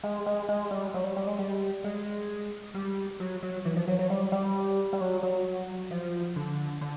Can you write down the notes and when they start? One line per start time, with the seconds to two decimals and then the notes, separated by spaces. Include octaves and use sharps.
0.03 G#3
0.26 G#3
0.49 G#3
0.71 G3
0.94 F#3
1.04 G3
1.16 G3
1.27 G#3
1.39 G3
1.84 G#3
2.74 G3
3.20 F#3
3.43 F#3
3.65 E3
3.76 F3
3.88 F#3
3.99 F#3
4.10 G3
4.32 G3
4.93 G3
5.01 F#3
5.23 F#3
5.91 F3
6.36 D3
6.81 D3